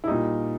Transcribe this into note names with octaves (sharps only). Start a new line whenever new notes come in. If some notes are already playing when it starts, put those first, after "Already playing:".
E4
A#2 G3 D#4